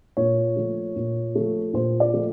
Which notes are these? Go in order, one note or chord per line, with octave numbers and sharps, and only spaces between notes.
A#2 C#5
F3 A3
A#2
F3 A3
A#2 C5
D5
F3 A3